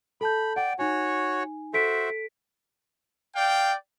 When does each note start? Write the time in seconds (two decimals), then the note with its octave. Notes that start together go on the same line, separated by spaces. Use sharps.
0.21 A4 A5 B5 G6
0.56 D5 F#5 G5
0.79 D#4 F#4 C#5 G#5
1.74 F#4 A4 C5 E5 B6 D7
3.36 D5 F5 G5